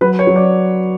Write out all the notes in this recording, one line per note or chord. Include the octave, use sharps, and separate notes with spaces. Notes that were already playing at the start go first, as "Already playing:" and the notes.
F#3 B4
C#5
F#3
D5